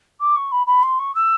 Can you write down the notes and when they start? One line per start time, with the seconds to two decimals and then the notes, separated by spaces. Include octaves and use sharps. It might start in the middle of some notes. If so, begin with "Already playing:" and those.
0.20 D6
0.35 C#6
0.51 B5
0.66 B5
0.82 C6
0.99 C#6
1.14 E6